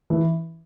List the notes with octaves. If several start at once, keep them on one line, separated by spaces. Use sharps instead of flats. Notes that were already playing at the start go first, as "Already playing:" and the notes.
E3